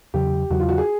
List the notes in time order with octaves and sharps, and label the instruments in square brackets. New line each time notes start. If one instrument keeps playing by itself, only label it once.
[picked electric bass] E2 C#3 F#3 [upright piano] G4
[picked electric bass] E2 C#3 F#3 [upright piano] F#4
[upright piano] F4
F#4
G#4